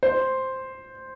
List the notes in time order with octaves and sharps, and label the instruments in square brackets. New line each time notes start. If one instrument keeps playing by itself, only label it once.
[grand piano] C5